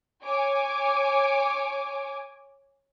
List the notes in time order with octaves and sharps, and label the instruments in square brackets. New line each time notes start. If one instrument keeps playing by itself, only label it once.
[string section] C#5 G#5 D6